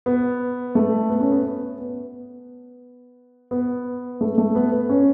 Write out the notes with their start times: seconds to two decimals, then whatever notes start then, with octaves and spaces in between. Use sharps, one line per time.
0.06 B3
0.75 A3
1.10 B3
1.21 C#4
1.31 B3
1.44 B3
1.78 B3
3.51 B3
4.21 A3
4.38 A3
4.55 B3
4.72 B3
4.89 C#4